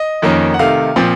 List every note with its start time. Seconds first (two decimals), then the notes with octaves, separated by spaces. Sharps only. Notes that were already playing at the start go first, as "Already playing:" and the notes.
Already playing: D#5
0.22 F2 D#3 A#3 C#4
0.54 F#5
0.59 C3 D#3 A3 F5
0.96 A#2 F3 C4